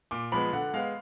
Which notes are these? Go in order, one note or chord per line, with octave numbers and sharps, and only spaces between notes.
A#2 D6
F3 G#3 B3 B5
D3 F#5
G#3 B3 F5